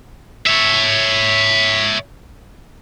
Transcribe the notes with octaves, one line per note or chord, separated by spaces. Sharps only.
C#5 E5